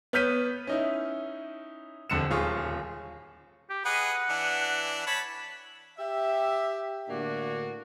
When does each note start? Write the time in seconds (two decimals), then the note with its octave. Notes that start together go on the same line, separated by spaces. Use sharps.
0.13 B3 C#5 F6 G6 B6 D#7
0.67 C#4 D#4 E4
2.10 E1 F2 D3 C#7 E7
2.31 D#1 F4 G#4 C#6
3.69 G4
3.85 G#4 B4 D#5 F#5
4.30 E3 D4
5.07 C#5 A5 B5
5.98 G4 E5
7.09 A2 D3 A#3 D4 F#4